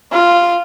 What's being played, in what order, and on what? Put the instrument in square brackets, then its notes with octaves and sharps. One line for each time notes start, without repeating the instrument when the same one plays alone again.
[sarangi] F4